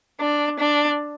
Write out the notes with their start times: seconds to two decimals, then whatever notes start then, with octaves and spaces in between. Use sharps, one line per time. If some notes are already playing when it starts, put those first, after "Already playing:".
0.21 D4
0.60 D4